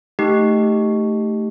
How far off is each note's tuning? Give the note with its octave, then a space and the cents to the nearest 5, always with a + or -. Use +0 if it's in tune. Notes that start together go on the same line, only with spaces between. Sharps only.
A3 +0 D#4 +0 G4 +0